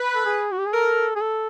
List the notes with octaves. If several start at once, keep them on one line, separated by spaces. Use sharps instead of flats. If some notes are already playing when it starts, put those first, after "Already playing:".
Already playing: B4
A4
G#4
F#4
G4
G#4
A4 A#4
G#4
A4